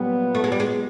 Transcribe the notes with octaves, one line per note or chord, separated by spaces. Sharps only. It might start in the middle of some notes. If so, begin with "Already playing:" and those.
Already playing: A#2 F#3 G3 B3
A3
G#3
G3
G#3